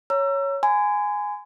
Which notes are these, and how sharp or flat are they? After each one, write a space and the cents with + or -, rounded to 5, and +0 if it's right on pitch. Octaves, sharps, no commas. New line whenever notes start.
C#5 +0 A#5 +0 E6 +30
G#5 +0 C6 -45